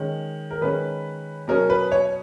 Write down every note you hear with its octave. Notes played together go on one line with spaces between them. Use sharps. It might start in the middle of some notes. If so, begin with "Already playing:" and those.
Already playing: D#3 G#3 C#4
A#4
D#3 G#3 C#4 B4
B2 F#3 C#4 A#4
B4
C#5